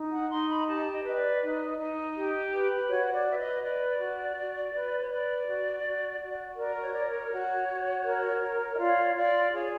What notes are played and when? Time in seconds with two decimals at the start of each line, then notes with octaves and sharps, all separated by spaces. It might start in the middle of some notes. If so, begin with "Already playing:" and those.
Already playing: D#4
0.11 F#5
0.30 D#4 C6
0.48 B5
0.59 A#5
0.67 G4 A5
0.92 D#5
1.04 B4
1.09 D#5
1.16 D5
1.40 D#4
1.78 D#4
2.15 G4
2.51 B4
2.88 F#4 C#5
3.08 C#5
3.14 D5
3.25 B4
3.30 E5
3.38 D#5
3.62 B4 D5
3.99 F#4
4.36 F#4
4.73 B4
5.01 C#5
5.09 B4 D5
5.47 F#4
5.83 F#4
6.21 F#4
6.57 A#4 D5
6.75 D5
6.82 C#5
6.94 C#5 D5
7.06 C#5
7.31 F#4
7.68 F#4
8.05 A#4
8.42 C#5
8.73 D#5
8.78 F4 D5
9.15 F4 D5
9.52 G#4 C#5